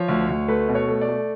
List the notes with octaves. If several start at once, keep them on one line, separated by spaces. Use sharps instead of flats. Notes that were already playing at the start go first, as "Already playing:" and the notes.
Already playing: F3 C#5
D2
D2
A3 B4
B2
C#5
A3
D5
A3